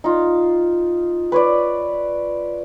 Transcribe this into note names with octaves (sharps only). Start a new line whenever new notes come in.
D#4 F4
B4 C#5 D5